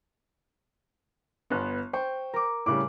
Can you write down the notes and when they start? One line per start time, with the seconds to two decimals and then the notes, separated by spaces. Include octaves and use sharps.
1.50 G1 B3
1.93 C5 G5 C#6
2.34 A#4 D6
2.66 A2 C#3 G3 D6 F#6